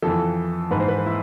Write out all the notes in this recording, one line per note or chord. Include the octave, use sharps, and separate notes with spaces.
F2 E3 A4
G#2 E3 B4 C5
B4
E4